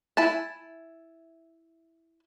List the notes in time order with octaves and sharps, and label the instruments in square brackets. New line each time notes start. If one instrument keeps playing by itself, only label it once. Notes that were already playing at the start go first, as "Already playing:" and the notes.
[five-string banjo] E4 G#5 A5